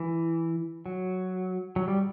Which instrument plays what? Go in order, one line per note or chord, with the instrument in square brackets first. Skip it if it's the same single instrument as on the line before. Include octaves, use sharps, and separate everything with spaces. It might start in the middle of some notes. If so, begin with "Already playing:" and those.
Already playing: [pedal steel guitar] E3
F#3
F#3
G3